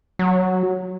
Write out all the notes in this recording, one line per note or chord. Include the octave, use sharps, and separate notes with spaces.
F#3